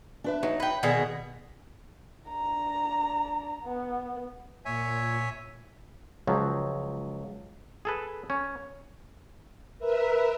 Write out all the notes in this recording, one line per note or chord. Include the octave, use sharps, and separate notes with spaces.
D4 B4 E5
F#3 D#4
B4 G5
B2 D3 D#3 G#4
D4 A#5
B3
A#2 C#5 E5 G#5
C#2 F3 F#3
G#4 A4 B4
C#4
A#4 B4 E5